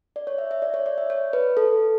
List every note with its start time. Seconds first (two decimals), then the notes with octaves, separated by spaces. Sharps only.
0.16 D5
0.27 C#5
0.38 E5
0.51 E5
0.62 D5
0.74 C#5
0.86 D5
0.98 E5
1.10 C#5
1.33 B4
1.57 A4